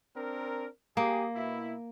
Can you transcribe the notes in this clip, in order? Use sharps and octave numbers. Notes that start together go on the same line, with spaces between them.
C4 D4 A#4
A#3 G4 G#4
B2 E4